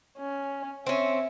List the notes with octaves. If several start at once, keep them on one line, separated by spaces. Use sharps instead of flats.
C#4
C4 C#4 E5